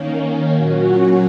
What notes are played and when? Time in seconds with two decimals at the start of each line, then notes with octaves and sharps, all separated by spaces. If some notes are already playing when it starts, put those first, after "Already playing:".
Already playing: D#3 A#3 C#4
0.49 A#2 F#3 C#4 F#4